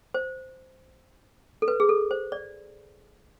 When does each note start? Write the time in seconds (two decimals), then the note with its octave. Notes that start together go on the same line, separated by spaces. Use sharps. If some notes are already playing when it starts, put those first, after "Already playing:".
0.14 C5
1.62 A4
1.68 B4
1.80 G#4
1.89 A4
2.11 C5
2.32 D5